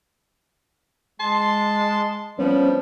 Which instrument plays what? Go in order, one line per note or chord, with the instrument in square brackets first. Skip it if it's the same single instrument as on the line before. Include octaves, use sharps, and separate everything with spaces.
[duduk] G#3 [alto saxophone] A5 [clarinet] C6
[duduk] F3 [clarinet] G3 [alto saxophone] B3 [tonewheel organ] C#4